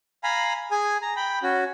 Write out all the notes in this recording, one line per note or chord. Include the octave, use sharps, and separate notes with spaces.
F5 G#5 A#5 B5
G#4 G#5
A#5
G5 B5
C#4 F#4